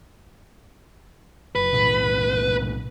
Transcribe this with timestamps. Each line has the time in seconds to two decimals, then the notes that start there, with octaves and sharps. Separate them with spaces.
1.56 F#1 B4
1.72 B1 A2 C3